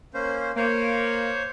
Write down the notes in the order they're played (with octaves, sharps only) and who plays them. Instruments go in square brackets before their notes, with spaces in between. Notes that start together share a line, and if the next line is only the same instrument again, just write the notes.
[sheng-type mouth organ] A#3 C#4 C5
[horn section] A#3 [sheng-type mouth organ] C5 C#5